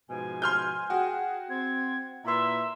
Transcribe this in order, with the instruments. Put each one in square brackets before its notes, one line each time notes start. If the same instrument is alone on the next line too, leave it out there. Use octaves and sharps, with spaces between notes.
[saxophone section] G#2 B2 F3 [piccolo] G#5
[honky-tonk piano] C6 F6 G6
[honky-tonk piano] F#4 [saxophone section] G#4 [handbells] G5
[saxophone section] C4 [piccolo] G#6
[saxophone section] A#2 E4 B4 [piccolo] E5 [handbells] A#5 C6